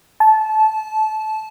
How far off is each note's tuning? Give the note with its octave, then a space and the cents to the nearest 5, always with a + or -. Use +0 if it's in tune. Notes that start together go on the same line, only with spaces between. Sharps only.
A5 -20